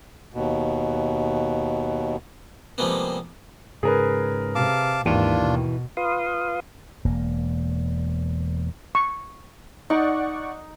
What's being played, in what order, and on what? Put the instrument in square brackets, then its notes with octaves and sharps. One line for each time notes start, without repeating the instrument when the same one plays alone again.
[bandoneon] D#2 B2
[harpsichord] C3 F3 G3 G#3 A#3 B3
[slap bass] G#2 C#3 [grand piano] G#4 A#4 B4
[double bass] C3 [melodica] F5 A5 D6
[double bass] G#1 G#2 [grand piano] D#2 [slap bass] E3 [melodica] D4 F4
[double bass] B2
[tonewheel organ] F4 B4 F5 C6 D#6
[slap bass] E1 A#3
[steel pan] C#6
[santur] D#4 [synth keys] D5 F#5 C#6